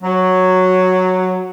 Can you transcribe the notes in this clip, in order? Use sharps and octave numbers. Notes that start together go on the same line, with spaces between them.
F#3